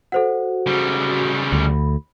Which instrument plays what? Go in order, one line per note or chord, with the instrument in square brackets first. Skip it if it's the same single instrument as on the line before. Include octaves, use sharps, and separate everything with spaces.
[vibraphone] F#4 [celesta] A4 C5 F#5
[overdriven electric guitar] C#3 G3 [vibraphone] F#4
[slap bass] D2 [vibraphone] B5